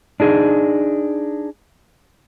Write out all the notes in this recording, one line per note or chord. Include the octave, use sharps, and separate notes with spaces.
D4 D#4 G#4